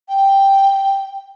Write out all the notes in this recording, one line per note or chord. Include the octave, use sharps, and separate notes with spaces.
G5